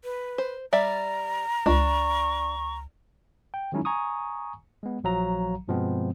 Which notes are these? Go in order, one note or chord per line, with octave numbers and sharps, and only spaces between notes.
B4
C5
G3 D5 E5 A#5
C#2 D4 C#6
G5
D#3 F#3 G#3 C#4 D#4 E4
G#5 A#5 C#6 D#6
G#3 B3
A#1 F3 F#3 F5 A#5
G2 B2 F3 G#3 B3 C4